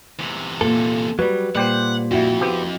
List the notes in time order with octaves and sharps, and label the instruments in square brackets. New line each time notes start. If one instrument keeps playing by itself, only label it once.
[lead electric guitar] E2 C3
[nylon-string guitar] A#2 [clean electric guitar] A4
[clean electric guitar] F#3 G3 [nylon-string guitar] B4
[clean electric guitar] A#2 [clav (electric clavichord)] G3 G4 C5 [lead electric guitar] F#5
[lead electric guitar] F2 [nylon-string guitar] E4 F#4
[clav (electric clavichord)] B3 C4 G4